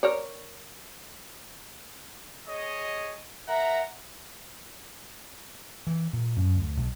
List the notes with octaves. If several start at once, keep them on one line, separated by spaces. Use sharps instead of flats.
A#4 C#5 D5
G#4 C#5 D#5
A#4 E5 F#5 A#5
E3
A#2
F#2
D2
B1